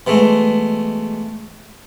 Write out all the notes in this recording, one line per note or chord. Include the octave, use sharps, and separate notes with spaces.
B2 E3 G#3 A3